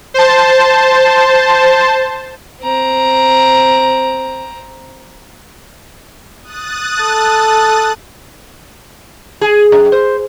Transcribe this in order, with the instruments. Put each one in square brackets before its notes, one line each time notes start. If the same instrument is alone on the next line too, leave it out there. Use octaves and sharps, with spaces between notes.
[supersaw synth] C5 A5
[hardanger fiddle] C4 A#5
[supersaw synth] D#6 F#6 A6
[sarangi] A4
[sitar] G#4
F#2
C5